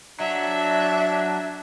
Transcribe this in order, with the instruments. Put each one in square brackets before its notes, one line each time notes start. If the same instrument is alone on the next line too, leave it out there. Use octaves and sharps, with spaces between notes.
[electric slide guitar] F#3 [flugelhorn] D4 [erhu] E5